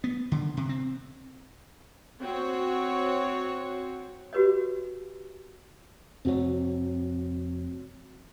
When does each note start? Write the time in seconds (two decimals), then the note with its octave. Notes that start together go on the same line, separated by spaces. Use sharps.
0.04 B3
0.32 D3
0.57 C3
0.69 C4
2.22 C4 F#4 C#5
4.33 F#4 G4 B4 C#5 D#5
6.25 F1 F2 A3 C4 F#4 C#5